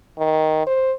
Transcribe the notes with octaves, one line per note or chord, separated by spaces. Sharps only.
D#3
C5